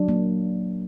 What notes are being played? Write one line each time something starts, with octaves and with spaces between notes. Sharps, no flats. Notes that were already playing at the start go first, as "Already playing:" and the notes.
Already playing: F#3 D4
A#3